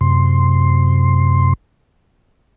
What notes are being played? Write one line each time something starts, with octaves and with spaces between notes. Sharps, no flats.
F#2 C3 C6